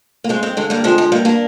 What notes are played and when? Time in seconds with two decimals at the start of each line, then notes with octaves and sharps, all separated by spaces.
0.24 A#3
0.29 G2 G#3 C4
0.43 G#3 C4
0.57 D3 G#3
0.70 G3 A#3
0.84 F3 G#3 C4
0.98 G#3
1.12 G2 G3 A#3
1.25 A#3 D4